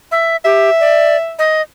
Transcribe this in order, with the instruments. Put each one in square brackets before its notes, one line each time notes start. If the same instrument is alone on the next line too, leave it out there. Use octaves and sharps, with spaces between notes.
[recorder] E5
[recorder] G4 [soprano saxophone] E5
[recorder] D5
D#5